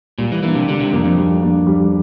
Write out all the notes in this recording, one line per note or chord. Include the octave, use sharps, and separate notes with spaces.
A#2 G3
E3
E3 A#3 D4
C3
D3 G3
C3
F2 A#3 D4
F2
G3
A#3 D4
G3